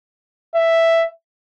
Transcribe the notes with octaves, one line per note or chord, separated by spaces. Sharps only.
E5